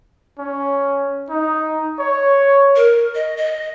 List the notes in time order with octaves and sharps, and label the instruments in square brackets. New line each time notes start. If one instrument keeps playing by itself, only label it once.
[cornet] C#4
D#4
C#5
[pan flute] A#4
D#5
D#5